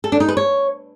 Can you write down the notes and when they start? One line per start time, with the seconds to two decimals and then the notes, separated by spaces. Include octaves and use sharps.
0.04 A4
0.12 D4
0.20 D#4
0.29 B4
0.37 C#5